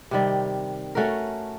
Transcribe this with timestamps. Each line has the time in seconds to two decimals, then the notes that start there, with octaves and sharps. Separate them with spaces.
0.11 C3 D#3 G3
0.95 A3 C#4 F#4 A#4